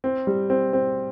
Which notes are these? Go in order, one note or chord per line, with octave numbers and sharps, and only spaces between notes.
C4
G3
C4
C4